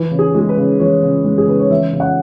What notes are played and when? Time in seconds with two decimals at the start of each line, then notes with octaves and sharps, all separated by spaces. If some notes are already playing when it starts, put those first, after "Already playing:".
Already playing: E3 B4
0.11 C#3
0.19 G#4
0.35 G#3 G#4
0.49 B4
0.57 C#3
0.79 E3 C#5
1.02 C#3
1.24 G#3
1.38 G#4
1.47 C#3 B4
1.59 C#5
1.71 E3 E5
1.93 C#3
2.00 F#5